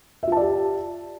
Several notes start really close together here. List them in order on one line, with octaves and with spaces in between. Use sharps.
E5 F4 A5 D5 G4